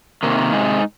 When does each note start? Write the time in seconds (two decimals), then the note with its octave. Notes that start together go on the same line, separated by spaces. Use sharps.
0.23 C3 D#3 A#3
0.53 C3 G#3 D#4